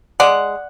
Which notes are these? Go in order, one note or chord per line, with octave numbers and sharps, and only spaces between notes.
G#3 D5 F#5